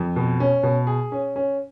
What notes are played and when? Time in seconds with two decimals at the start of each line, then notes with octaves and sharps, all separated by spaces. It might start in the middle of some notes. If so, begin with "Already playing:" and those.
Already playing: F2
0.16 B2
0.40 C#4
0.63 B2
0.87 G#4
1.12 C#4
1.36 C#4